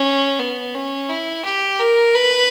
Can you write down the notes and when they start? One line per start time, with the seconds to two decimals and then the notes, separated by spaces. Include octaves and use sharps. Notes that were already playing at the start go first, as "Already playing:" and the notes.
Already playing: C#4
0.40 B3
0.75 C#4
1.09 E4
1.45 G4
1.79 A#4
2.15 B4